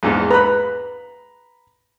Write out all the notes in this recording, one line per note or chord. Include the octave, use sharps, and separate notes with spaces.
A#1 E2 G#2
B4 A#5 B5